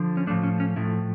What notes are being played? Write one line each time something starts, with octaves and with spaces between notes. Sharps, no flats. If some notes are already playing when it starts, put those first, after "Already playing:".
Already playing: D3 F3
C#4
A2 F3 A3 D4
C#4
C#4
A2 F3 A3 E4